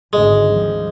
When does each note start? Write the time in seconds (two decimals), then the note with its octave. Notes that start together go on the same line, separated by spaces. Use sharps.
0.13 G#1 D2 G#2 G#3
0.48 F3 G3